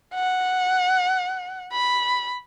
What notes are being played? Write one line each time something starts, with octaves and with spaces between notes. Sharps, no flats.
F#5
B5